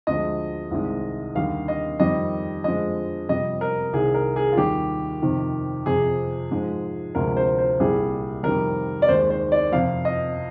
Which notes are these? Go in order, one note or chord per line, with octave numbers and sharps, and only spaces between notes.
D2 D3 F3 G#3 D#5
C2 C3 D#3 G#3
D#2 D3 G3 F5
D#5
F2 D#3 G3 D#5
F2 D3 F3 G#3 D#5
F2 C3 G3 D#5
A#4
C2 C3 D#3 G#4
A#4
G#4
F4
D#2 D#3 G3 G4
F2 C3 D#3
F2 C3 F3 G#4
G#2 F3 G#3
D2 C3 F3 G#3 A#4
C5
C5
C2 A#2 G3 G#4
F2 C3 D#3 G3 A#4
D5
D#2 D#3 G#3 C5
C5
D5
F2 C3 F3 F5
D#5